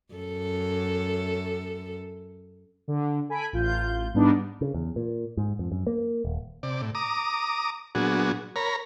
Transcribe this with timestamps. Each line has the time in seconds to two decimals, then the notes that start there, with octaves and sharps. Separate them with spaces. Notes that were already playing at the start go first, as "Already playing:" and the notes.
0.14 F#2 A4
2.88 D3
3.29 A4 G#5 B5 B6 D7
3.53 A1 F4 G6
4.14 G#2 G3 B3 D4 D#4
4.61 C#3
4.74 E2
4.96 A#2
5.37 G#2
5.59 F2
5.72 F#2
5.87 A#3
6.25 D#1
6.63 C3 D5
6.81 A2
6.95 A#5 D6 D#6
7.95 A#2 F#3 B3 D4 F#4 G#4
8.56 A#4 C#5 A#5 B5